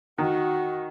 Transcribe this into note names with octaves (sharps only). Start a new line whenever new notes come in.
D#3 F#4